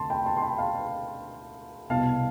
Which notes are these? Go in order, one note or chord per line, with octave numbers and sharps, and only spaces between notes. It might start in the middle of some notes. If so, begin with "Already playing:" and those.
Already playing: D2 C3 A3 A5 C6
G5 B5
A5 C6
C6
G5 B5
F5 A5
C2 B2 G3 B3 F5 A5